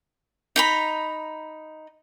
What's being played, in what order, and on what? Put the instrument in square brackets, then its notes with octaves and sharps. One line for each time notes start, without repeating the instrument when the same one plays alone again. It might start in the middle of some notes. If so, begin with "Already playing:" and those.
[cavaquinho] D#4 A#5 B5